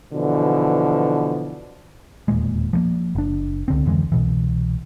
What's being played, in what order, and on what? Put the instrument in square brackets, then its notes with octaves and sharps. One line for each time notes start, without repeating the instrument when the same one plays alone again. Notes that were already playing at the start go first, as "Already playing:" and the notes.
[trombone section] B2 D3 E3 F3
[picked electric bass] E1 D#2 A#2 G#3
F3 G3 A#3
F#1 D4
C#2 D3 C4
F2 D3 E3 G#3
C2 B2 E3